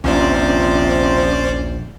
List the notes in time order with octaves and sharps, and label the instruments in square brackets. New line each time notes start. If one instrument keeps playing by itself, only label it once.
[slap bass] A#1 D#2 [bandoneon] C3 F3 [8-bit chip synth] C#4 C5 D5